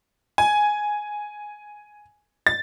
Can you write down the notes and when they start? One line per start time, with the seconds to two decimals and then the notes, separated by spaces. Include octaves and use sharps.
0.38 G#5
2.47 A6